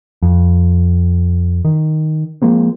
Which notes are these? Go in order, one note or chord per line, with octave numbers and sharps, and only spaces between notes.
F2
D#3
F3 G#3 A#3 C4